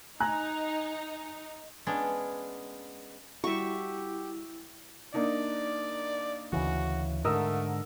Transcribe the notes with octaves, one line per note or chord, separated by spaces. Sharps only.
D#4 G#5 A#5 F#6
G#3 B3 C#4 D4
G3 E4 F#4 G4 E5 C#6
A#3 D4 D#4 D5
D2 C#3 E3 F#4
G#2 D3 A3 A#4 D#6 E6